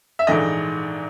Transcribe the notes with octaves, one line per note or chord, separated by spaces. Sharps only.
E5
A#1 G#2 E3 A3 D#5